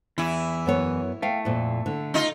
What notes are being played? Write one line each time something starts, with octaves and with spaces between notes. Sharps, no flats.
E2 E3 E4
F#2 B3 C#5
A3 F5 G5
F2 A#2
D3
D#4 F4